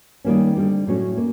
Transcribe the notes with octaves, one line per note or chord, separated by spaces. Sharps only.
D#3 G3 A#3 C#4
D3 G3 C4
A2 F#3 A3 C#4
A#3